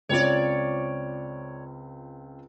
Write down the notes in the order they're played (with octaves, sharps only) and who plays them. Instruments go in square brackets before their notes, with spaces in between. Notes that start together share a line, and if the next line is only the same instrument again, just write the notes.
[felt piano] C#2 C4 F4 [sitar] C#5 D5